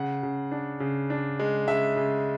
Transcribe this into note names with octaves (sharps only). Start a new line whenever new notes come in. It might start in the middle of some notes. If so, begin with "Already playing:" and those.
Already playing: C#3 F#5
C#3
D4
C#3
D4
G#3
C#3 E5
C#3